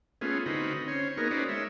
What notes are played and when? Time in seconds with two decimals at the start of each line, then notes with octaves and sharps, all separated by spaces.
0.21 A3 B3 C#4 F4 G#4
0.46 D3 C4 D#4 F#4 B4
0.88 C#4 C5 C#5
1.17 A#3 B3 D#4 F#4 G#4 A#4
1.31 C#4 D#4 F#4 B4 C5 D5
1.49 G#3 C#5 E5